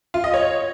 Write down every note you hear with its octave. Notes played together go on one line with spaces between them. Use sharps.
F4
D#5
C#5